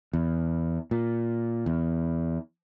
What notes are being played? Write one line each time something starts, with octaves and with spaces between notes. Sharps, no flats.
E2
A#2
E2